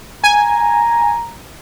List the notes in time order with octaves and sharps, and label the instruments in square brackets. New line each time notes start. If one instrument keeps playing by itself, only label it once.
[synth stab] G#5 [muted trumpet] A#5